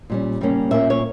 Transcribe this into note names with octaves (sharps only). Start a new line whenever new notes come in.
A#2 G3 C#4
C#3 G3 A#3 C#4
A#2 A#3 C#4 E5
C#5